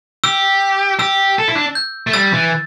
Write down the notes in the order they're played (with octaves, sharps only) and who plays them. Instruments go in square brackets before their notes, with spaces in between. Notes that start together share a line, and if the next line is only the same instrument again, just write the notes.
[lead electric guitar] G4 [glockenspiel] E6
[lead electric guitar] G4 [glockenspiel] E6
[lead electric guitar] A4
E4
D4
[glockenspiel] G6
[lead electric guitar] A3
[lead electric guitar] G3 [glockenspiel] E6 A6
[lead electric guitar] E3